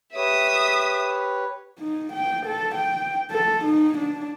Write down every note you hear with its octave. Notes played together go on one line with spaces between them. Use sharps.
G4 B4 C#5 E5 D#6
D#4
G5
A4
G5
A4
D#4
D4